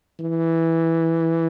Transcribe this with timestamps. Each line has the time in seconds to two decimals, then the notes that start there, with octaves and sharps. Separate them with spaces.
0.20 E3